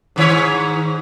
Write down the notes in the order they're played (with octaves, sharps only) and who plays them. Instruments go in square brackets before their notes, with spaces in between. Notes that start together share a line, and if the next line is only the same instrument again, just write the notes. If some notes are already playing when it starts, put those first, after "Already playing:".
[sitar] G#2 D#3 C#5